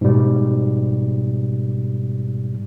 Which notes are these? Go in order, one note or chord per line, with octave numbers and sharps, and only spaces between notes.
G#2 B2 G3